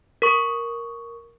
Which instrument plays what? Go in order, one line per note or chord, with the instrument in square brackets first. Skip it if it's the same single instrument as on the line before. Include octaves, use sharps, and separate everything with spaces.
[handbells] A#4 C#6